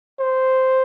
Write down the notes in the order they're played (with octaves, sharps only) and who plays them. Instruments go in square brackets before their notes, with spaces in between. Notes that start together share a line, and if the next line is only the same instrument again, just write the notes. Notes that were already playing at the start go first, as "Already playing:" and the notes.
[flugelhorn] C5